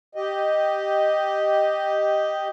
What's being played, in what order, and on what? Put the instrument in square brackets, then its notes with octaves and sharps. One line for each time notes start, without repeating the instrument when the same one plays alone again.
[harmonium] G4 D#5